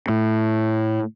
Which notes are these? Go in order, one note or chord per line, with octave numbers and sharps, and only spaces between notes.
A2